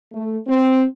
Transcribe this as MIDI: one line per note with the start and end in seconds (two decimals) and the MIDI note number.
0.12 0.37 57
0.47 0.84 60